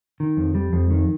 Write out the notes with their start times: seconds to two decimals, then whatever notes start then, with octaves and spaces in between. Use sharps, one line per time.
0.20 D#3
0.37 F2
0.55 G3
0.73 F2
0.90 D#3